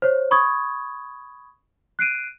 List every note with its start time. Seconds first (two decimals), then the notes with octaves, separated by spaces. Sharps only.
0.02 C5 C#5
0.31 B5 C#6 D#6 G#6
1.99 F#6 C7 D7 D#7